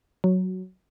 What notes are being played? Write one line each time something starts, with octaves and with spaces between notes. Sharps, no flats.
F#3